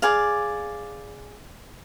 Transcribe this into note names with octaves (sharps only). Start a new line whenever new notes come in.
G#4 D5 F5